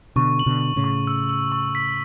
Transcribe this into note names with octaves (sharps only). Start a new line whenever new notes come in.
B2 D3 C#6
F#7
B2 D3
F#7
A2 C#3
C#6
E6
E6
C#6
B6